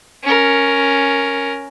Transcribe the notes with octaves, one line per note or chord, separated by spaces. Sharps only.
C#4 A#4